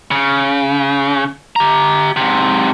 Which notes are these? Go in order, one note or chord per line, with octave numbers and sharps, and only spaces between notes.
C#3
G4 A#5
G#2 C3